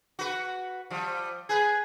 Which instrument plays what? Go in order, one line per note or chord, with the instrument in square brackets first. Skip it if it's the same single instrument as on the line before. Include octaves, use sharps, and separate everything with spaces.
[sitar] F#4 B4
F3 G3
[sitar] G#4 B4 [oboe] G#5